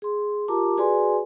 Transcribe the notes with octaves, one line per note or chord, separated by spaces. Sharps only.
G#4 C6
F4 G4 A#4 A5 A#5 D6
F#4 G#4 B4 D5 G#5 C6